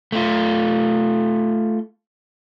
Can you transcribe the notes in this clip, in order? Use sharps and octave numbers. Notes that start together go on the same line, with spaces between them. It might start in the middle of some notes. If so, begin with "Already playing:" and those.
A3 F4